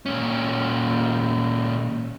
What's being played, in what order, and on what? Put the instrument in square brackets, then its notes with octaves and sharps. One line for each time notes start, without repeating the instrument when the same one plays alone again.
[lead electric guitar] A#2 C#4